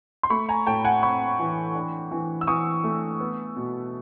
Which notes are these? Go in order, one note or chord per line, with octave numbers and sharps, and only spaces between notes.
C6
A3 B5 C#6
G#5 A#5
A2 G5 A5
F#5 G#5
C4 B5 C#6
E3
D4
E3
E6
E3 C#6 D#6
A3
B3
B2